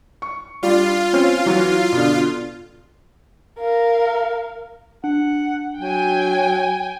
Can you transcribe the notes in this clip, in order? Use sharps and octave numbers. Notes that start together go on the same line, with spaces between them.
C#6
G3 D4 F4
C4 C#4
E3 F#3 F#4
B2 D3
A#4 F5
D4 F#5
F#3 G5 G#5